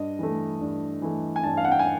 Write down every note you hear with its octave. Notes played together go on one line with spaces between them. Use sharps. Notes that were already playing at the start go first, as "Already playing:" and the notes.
Already playing: G2 D#5
E3 A3
G2
E3 A3
G#5
G2 A5
F5
F#5
G5
G#5